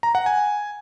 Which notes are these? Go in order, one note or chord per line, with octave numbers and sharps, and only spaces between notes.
A#5
F#5
G#5